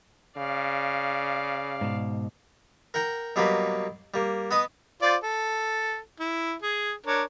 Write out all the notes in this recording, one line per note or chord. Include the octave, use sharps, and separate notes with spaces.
C#3 D5 F5
G#2 B2
A#4 F#5 G5 A#5
B2 F#3 G3 A#3 F#4 B4
G3 A#3
B3 B4 D#5 D#6
F4 C5 D5
A4
E4
G#4
D4 A#4 C#5